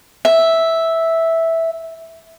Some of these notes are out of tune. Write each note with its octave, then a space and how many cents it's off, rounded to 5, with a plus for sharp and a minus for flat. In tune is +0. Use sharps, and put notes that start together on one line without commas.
E5 -5